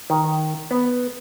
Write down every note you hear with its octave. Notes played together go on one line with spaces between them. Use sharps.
D#3
B3